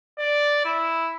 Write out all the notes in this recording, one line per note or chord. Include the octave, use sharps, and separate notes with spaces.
D5
E4